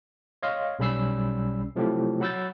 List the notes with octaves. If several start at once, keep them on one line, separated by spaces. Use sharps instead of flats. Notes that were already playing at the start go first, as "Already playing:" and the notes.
C#5 D#5 F5 C6
B1 G3 C#4 B5 E6 C7
C3 F3 F#3 A3 E4 G4
F#3 F#5 B5 E6 G6 A6